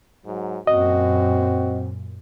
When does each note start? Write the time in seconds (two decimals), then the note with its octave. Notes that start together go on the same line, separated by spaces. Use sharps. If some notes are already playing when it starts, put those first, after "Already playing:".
0.26 G#2 F#3
0.67 F#2 A#2 C4 F#4 D#5